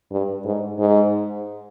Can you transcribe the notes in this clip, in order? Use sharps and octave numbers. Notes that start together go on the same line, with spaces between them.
G2
G#2
G#2